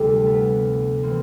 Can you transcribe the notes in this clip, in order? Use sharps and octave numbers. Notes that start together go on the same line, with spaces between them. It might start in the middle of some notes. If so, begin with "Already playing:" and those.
Already playing: D2 C3 F3 G3 A3
A3 B3
E3 A#3 C4